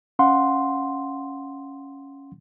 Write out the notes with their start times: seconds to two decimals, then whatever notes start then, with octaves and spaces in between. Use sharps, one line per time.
0.19 C#4 F5 F#5 C6